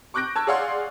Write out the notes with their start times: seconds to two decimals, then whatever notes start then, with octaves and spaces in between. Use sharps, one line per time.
0.14 C#6 D6 F#6 G6 A#6 D7
0.36 A5 C#6 E6 G#6
0.47 G#4 C#5 D5 F5 F#5 C6